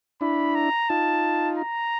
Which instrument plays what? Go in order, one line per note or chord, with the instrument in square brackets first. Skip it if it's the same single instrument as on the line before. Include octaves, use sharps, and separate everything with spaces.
[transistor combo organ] D4 E4 [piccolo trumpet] B5
[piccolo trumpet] A#5
[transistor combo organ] D#4 F4 [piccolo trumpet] A5
[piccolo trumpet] A#5